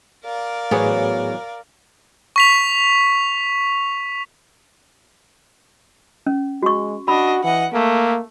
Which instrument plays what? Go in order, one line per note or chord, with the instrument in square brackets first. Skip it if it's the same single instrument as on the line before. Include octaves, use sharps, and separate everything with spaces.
[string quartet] A#4 D5 F5
[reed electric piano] A2 G#4 B4 [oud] E3 F#3 B3
[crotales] C#6 B6 F7
[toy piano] C#4
[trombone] G#3 [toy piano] F#4 C#6
[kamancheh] D4 D#5 [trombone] F#4 [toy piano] B5
[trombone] E3 [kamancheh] D#5 F#5
[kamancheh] A3 [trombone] A#3